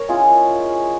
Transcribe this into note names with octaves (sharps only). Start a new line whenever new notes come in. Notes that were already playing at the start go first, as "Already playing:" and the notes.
Already playing: A#4 C#5
G#3 C#4 E4 F4 G#4